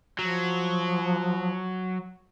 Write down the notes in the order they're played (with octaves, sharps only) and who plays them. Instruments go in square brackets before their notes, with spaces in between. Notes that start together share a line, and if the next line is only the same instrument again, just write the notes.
[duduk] F3 [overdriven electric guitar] F#3